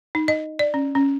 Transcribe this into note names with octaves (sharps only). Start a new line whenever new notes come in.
D#4
D#5
D5
C#4
C#4